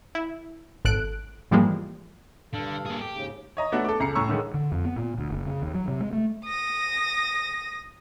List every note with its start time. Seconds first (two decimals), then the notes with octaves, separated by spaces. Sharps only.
0.15 E4
0.85 G#1 A4 F#6 D7
1.51 G#2 E3 F3 G3 G#3 A#3
2.53 G2 D3 A4 F5
2.86 A#3 G#4
3.01 G4
3.13 D#2 G#2 C#3
3.57 C#5 D#5 A#5
3.72 A3 B3 D4 F#4
3.84 A4 D6
4.00 C#2 A#5 C7 C#7
4.15 A2 C#4 A#5 C#6 E6
4.29 D3 D#3 G#3
4.54 D3
4.72 F2
4.85 B3
4.96 A#2
5.18 D2
5.30 F#1
5.46 C#3
5.62 D#2
5.75 F#3
5.88 C3
6.00 G#3
6.13 A3
6.45 D#6 A#6